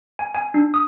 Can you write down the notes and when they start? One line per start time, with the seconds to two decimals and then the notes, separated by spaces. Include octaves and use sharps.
0.19 G#5
0.34 G#5
0.54 D4
0.74 D#6